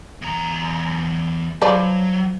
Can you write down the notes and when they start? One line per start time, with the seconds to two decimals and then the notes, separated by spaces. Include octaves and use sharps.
0.22 E2 A#5
1.62 F3 F#3 B4 D5